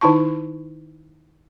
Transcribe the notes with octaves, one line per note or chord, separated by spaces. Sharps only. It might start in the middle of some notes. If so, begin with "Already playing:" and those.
D#3 D#4 E4 A5 C#6